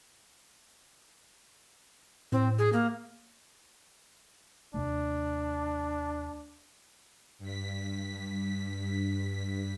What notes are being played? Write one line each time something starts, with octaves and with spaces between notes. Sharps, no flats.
A2 C4
G#4
A#3
D#2 C3 A3 D4
G2 B6